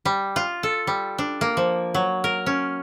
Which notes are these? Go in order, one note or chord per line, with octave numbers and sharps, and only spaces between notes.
G3
F4
A4
G3
D4
A#3
F3
F#3
A#4
C#4